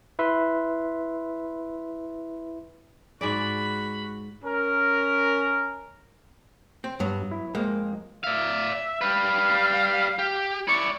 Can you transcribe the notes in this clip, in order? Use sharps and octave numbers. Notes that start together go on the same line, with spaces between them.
E4 B4 E5 C6
G#2 F#4 G#4 D5 B5
C#4 A#4
C4
G2 F#3 B3
E4
F2 G#3 A#3 C5
D5 E5 F5
G3 B4 F5
G4
E4 D5 C#6